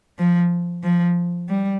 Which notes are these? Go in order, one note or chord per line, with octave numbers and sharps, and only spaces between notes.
F3
F3
G3